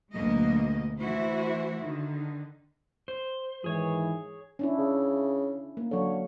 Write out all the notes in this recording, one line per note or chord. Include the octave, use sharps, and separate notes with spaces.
D2 B2 F#3 G#3 A#3 D#5
E3 A3 E4 F#4 C5
D3 D#3
C5
G#2 D#3 E3 G#4 C#5
C#4 D4 E4
C#3
A#3
D3 F#3 C#5